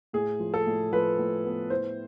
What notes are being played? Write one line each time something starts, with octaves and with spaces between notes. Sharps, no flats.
A2 G#4
F3
A4
A2
F3 B4
A2
B3
E4 C5